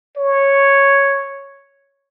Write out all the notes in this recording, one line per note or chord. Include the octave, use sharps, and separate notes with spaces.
C#5